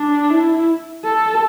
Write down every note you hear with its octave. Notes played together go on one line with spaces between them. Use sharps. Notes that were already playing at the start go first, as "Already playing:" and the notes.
Already playing: D4
E4
A4